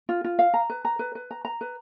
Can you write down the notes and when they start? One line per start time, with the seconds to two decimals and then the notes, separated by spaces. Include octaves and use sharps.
0.09 F4
0.24 F4
0.39 F5
0.54 A#5
0.70 B4
0.85 A#5
0.99 B4
1.15 B4
1.31 A#5
1.45 A#5
1.61 B4